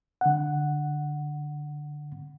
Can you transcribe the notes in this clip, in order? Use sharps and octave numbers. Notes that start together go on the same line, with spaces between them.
D3 F#5